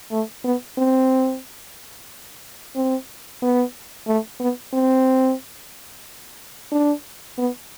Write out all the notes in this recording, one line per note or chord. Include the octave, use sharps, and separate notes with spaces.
A3
B3
C4
C4
B3
A3
B3
C4
D4
B3